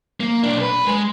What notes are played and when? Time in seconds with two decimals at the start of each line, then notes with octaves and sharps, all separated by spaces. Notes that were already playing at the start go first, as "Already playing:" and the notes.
0.20 A#3
0.43 B1 D4
0.61 B4
0.87 G#3